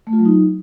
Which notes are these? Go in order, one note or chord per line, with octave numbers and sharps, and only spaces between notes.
A3
F4
F#3
D#4